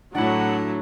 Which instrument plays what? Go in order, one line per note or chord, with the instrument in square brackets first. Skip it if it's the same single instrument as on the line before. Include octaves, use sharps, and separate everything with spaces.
[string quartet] A2 A3 [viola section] F#3 [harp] D4 E4 [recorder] F#5